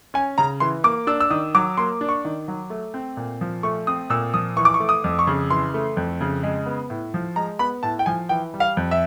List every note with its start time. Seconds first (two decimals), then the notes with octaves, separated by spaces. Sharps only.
0.14 C#4 G#5
0.38 C#3 A#5
0.60 E3 C6
0.84 A#3 D6
1.07 D4 E6
1.20 E6
1.30 D#3 D#6
1.55 F#3 D6
1.77 A#3 C6
2.01 D4
2.09 C#6
2.25 D#3
2.48 F#3
2.70 A3
2.94 C4
3.17 A#2
3.41 F3
3.63 A3 C#6
3.87 C4 D#6
4.10 A#2 E6
4.34 F3 D#6
4.56 E3 C#6
4.65 D6
4.74 C#6
4.80 A3
4.89 D#6
5.04 F2
5.19 C#6
5.27 C#3
5.50 E3 C6
5.74 A3
5.97 F2
6.21 C#3
6.43 G#3
6.66 B3
6.90 A2
7.14 F3
7.36 G#3 A#5
7.59 B3 B5
7.83 A2 A5
7.99 G5
8.06 F3 G#5
8.29 E3 G5
8.54 G3
8.60 F5
8.77 F2
8.91 E5